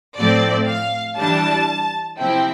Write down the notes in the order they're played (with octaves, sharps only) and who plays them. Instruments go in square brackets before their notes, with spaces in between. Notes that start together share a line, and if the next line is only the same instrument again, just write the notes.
[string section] A2 F3 A3 C4 D5
F5
E3 G3 D4 A5
C3 F3 C4 E4 G5